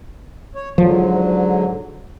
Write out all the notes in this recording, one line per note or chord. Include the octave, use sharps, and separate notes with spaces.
C#5
G#2 D3 F3 F#3